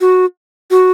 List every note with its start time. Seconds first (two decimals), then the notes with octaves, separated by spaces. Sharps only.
0.01 F#4
0.71 F#4